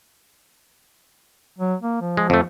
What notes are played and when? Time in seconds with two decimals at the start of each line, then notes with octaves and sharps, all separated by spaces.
1.59 F#3
1.82 A#3
2.01 F3
2.17 G#3
2.30 F2 A3